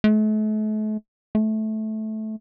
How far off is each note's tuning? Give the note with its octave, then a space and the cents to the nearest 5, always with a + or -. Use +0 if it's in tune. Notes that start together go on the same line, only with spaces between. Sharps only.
A3 -40
A3 -15